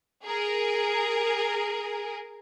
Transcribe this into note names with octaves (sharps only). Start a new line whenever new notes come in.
G#4 A#4